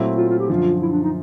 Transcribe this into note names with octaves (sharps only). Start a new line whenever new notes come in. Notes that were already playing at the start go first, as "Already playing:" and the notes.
Already playing: A#2 F#3 A3 C4 E4
F4
F4
G4
F#2 D3 F3 F4
E4
D4
D#4